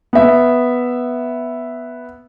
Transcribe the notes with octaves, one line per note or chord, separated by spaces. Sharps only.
B3 E5